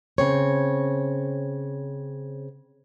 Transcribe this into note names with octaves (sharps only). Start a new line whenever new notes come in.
C#3 C4 C#5